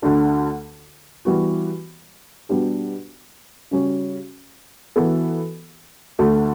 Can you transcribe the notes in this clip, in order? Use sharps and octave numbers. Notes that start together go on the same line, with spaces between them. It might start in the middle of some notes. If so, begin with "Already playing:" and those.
D2 D3 A3 D4
E3 G3 B3 F#4
B2 G3 B3 D4 G4
C#3 G3 C#4 F#4
E3 B3 F#4 A4
D2 D3 A3